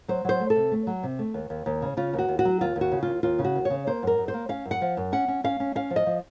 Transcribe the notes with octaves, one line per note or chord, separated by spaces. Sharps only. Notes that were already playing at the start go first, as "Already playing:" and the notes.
F#3 C5
F#3 C5
A3
A4
C3
A3
F#3
C3
A3
D#2
D#2
D#2
C#3
C#3 F4
D#2
F#4
D#2
F#4
F#3
D#2 F4
D#2
F#4
C#3
D#2 F4
D#2 F4
C#3
F#4
D#2
C#5
C#3
A#3 C5
F#2 A#4
F#2
C5
A#3
C#4 F5
F#2
F#5
F3
F#2
C#4 F#5
C#4
C#4 F5
C#4
C#4 F5
F3
D#5
F3